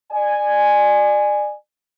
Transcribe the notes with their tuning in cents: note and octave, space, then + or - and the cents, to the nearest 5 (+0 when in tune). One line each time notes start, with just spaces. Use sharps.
D5 +35 G#5 +0